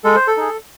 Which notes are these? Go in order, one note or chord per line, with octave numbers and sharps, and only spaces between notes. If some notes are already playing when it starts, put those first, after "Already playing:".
G#3 A4
C5
A4
D#4 G#4